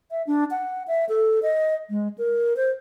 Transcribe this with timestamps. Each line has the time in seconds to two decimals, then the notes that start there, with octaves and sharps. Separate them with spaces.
0.11 E5
0.27 D4
0.51 F#5
0.88 E5
1.09 A4
1.43 D#5
1.90 G#3
2.18 A#4
2.57 C5